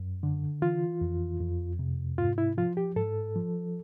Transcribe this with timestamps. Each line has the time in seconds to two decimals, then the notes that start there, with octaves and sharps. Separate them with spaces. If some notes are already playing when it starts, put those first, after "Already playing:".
Already playing: F#2
0.23 D3
0.62 E3 F4
1.01 F2
1.40 F2
1.79 C3
2.18 G#2 F4
2.38 E4
2.57 F3 F4
2.77 G4
2.96 G#2 A4
3.36 F3